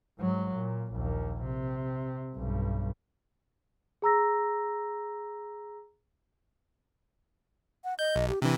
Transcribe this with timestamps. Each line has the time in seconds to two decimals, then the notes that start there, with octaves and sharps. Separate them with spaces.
0.19 G#2 F#3
0.54 A#2
0.92 A#1 D#2
1.43 C3
2.35 B1 G2
4.02 G#4 A#5 E6 A#6
7.84 F#5
7.99 D#5 G6
8.16 B1
8.28 G4
8.42 C3 E3 D4